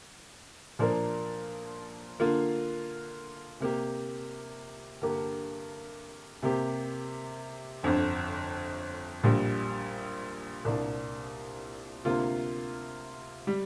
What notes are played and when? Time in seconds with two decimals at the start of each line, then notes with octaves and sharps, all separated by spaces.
0.79 A#2 F3 A#3 D4 A#4
2.20 D3 A#3 F4
3.60 C3 A#3 G4
5.02 G2 D3 A#3 G4 A#4
6.43 C3 A#3 G4
7.83 G1 F2 D3
9.23 A#1 A#2 G3
10.65 C2 A#2 A#3 D4
12.05 D2 C3 A#3 F4
13.47 G3